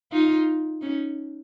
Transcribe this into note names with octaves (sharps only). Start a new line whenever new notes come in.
D#4 F4
C#4 D#4